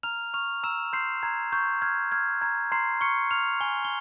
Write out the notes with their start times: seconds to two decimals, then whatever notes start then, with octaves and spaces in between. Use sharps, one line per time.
0.03 A#5 F6 F7
0.34 C#6 F6 F7
0.63 A#5 E6 E7
0.93 C6 G6 C7
1.23 A#5 G#6
1.52 C#6 G6
1.82 F6 G#6
2.12 F6 G#6
2.41 A#5 G#6
2.72 A#5 C6 C7
3.01 C#6 F6 C#7
3.31 F6 F7
3.60 G#5 G7
3.85 G7